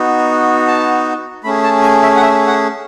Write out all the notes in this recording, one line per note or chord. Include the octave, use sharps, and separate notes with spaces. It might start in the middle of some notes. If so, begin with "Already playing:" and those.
Already playing: B3 D#4 F#4
A5
A3 C#4 G#4 B5
A5
G#5
E5
F#5
E5
F#5